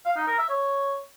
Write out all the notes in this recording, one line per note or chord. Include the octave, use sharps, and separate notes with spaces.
F5
D#4
A#4
E5
C#5